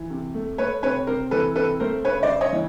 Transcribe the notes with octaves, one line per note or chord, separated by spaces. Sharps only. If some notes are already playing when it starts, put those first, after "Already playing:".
Already playing: E3
C3
A3
A3 B4 C#5
C3 B4 C#5
C3 A#4 C5
E3 A4 B4
C3 A4 B4
A3 A#4 C5
C#3 B4 C#5
C5 D5
C#3
C#5 D#5
E3